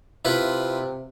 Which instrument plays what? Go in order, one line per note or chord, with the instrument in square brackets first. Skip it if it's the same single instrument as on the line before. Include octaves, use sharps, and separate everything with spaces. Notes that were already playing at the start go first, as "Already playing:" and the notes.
[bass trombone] C3 [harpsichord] E4 F4 B4